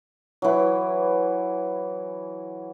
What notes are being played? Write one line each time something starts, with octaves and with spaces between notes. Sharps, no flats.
E3 F#3